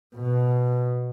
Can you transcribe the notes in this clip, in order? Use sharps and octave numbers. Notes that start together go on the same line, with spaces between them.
B2